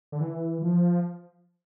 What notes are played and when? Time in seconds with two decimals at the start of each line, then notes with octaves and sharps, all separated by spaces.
0.12 D3
0.21 E3
0.62 F3